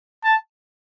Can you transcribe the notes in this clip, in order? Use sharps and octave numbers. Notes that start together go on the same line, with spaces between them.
A5